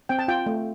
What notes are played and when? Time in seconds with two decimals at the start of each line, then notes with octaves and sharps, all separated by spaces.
0.09 C4 G5
0.19 A5
0.28 F4 G5
0.46 A3